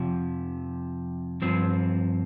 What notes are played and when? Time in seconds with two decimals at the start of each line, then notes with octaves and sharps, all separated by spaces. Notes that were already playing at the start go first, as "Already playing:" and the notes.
Already playing: F2 C3 F3
1.42 G2 F3 C4